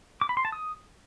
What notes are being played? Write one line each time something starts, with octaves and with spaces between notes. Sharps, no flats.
D6
B5
C6
A5
D#6